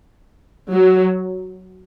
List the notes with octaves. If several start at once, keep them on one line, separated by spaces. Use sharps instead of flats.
F#3